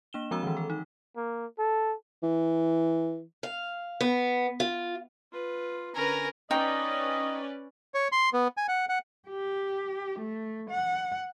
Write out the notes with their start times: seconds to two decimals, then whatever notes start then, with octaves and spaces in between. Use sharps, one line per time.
0.13 A#3 D4 E7 G7
0.31 F3 G#3 C4 F#4 A#5 E6
0.43 D#3 E3
0.57 A4
0.70 D#4
1.16 A#3
1.59 A4
2.23 E3
3.43 F5
4.01 B3
4.60 F4
5.32 F4 B4
5.95 D3 C#4 A#4 B4 G#5 A#5
6.51 C#4 D#4 B4 D5 D#5 G5
7.94 C#5
8.12 C6
8.33 B3
8.57 G#5
8.68 F#5
8.89 F#5
9.28 G4
10.19 A3
10.70 F#5